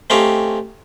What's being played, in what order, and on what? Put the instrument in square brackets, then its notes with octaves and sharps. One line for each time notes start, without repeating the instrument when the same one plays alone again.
[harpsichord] A3 C4 C#4 D#4 G4 F5